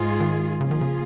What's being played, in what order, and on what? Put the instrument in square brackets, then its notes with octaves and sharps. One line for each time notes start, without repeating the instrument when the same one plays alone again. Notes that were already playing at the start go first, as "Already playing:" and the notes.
Already playing: [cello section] G#2 G#3 F4 G#4
[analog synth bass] D#3
[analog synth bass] C#3 [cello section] F3 A#3 F4 G#4
[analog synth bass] D#3
C#3